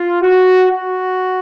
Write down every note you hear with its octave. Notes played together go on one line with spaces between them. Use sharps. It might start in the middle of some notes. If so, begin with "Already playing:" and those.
Already playing: F4
F#4
F#4